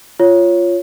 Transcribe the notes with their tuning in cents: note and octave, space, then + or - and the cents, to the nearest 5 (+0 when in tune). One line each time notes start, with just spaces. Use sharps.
F4 -10 C#5 +0